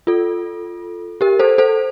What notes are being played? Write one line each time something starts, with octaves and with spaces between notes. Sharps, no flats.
F4 A4
G4 A#4
A4 C5
A4 C5